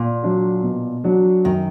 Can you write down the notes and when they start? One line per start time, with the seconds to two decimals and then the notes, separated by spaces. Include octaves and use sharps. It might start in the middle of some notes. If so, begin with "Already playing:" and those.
Already playing: A#2
0.23 F#3 D4 F#4
0.63 B2
1.04 F#3 D4 F#4
1.45 F#2 D#3